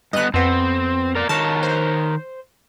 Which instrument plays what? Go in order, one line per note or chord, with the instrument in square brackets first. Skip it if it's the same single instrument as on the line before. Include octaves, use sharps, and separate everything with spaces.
[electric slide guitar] G2 B3 [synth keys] D#5 F#6
[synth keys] F2 B3 [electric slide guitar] C4
[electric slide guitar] A#4 D5
[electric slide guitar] D#3 A#4 C#5 [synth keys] A5
[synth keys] C5